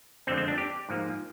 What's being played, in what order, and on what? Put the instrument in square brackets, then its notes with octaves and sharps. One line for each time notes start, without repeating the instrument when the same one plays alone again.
[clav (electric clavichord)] F2 D3 G#3 C4
C4
D4
G4
G#2 F3 A#3